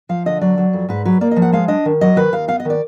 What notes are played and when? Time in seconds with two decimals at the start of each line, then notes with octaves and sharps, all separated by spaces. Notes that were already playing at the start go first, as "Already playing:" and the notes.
0.09 F3 F5
0.26 D3 D#5
0.41 F#3 D5
0.58 F#3
0.73 F2
0.89 G#2 B4
1.05 F#3 B4
1.21 A#3 D5
1.31 F3 D#5
1.42 F#5
1.52 G#3 F5
1.68 D4 D#5
1.85 D#3
2.01 F#3 D#5
2.16 D#3 B4
2.33 D#2 F5
2.48 B3 F5
2.60 D#5
2.65 D#3 D5